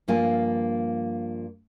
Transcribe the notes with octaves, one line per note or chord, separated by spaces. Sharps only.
G2 F3 A#3 F4 F5 G#5